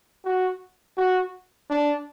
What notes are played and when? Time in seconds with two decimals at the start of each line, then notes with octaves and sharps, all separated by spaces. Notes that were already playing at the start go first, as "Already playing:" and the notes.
0.25 F#4
0.97 F#4
1.70 D4